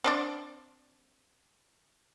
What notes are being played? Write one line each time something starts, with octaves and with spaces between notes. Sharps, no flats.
C4 D4 D5